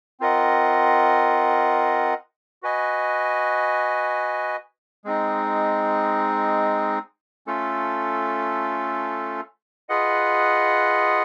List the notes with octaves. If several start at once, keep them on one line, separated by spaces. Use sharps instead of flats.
C4 F4 A#4 D#5 F#5
F#4 B4 D#5 G#5
G#3 C4 D#4
A3 C#4 F4 A4
F4 G#4 B4 D#5 F#5